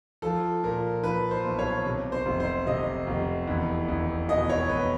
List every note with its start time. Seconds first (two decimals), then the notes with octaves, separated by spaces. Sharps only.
0.22 F3 A4
0.64 A#2 A#4
1.03 F3 B4
1.31 C5
1.45 B1
1.59 C#5
1.85 C3
2.12 C5
2.26 F1
2.40 C5
2.67 C3 D#5
3.07 F1
3.47 E2
3.88 E2
4.29 B2 D#5
4.49 C#5
4.69 E2 B4